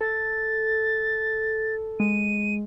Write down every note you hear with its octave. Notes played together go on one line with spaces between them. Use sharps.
A4 A6
G#3 D#7